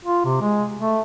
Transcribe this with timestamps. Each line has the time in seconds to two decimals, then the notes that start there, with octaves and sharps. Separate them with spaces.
0.05 F4
0.25 C3
0.41 G#3
0.78 A3